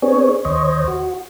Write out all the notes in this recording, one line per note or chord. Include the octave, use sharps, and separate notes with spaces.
B3 C4 D4 G#4 C#5
D#2 C5 C#5 D#5
F#4